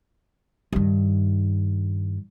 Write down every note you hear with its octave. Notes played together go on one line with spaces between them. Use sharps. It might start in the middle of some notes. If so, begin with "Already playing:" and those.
G2 D#3